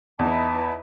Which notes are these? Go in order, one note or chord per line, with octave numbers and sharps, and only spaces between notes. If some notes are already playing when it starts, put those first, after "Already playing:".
E2 D#4 E4 B4 A5